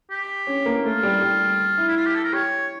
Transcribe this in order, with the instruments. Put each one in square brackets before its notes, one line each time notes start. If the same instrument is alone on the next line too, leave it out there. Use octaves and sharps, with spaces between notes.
[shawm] G4
[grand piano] C#4
A#3
[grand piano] A3 [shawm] F4
[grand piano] G3
G3
E4
[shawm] E4
F4
G4
A4
A#4
[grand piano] G4 [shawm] C#5